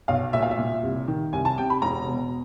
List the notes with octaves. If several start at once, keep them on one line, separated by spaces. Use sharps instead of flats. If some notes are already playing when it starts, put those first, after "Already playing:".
B1 F5
A#2 E5
F5
E5
A#2
C2
D#3
C2 G#5
A5
C3 G5
B5
E1 A#5
B2